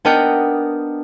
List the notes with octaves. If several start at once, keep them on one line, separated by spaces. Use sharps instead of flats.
B3 D4 A#4 D#5 F#5 G5